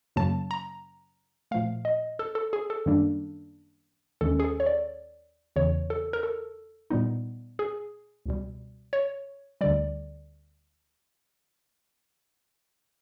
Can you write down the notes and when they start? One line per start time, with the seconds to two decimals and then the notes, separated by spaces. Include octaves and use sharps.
0.16 F#2 C#3 F#3 A#3 A5
0.51 A#5
1.51 A#2 F3 A3 F5
1.85 D#5
2.19 A4
2.35 A4
2.53 G#4
2.70 A4
2.86 F#2 D#3 G3 A#3 D4
4.21 D#2 D#3 G#3 C#4 A4
4.40 G#4
4.44 A4
4.60 C#5
4.66 D5
5.56 E2 C#3 E3 C#5
5.90 A4
6.13 A#4
6.23 A4
6.90 A#2 G3 B3 D#4
7.59 G#4
8.26 C#2 B2 G3
8.93 C#5
9.61 D2 D3 G3 D5